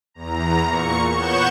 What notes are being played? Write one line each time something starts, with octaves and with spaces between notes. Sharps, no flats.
E2 A#5
A#2 C#6 C#7
B3 C#5 F#5 C#6 G6 E7